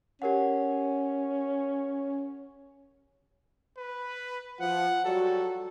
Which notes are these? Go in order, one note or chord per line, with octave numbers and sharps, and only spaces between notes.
C#4 G4 A#4 F#5
B4
F3 F#5
F#3 G3 F#4 A4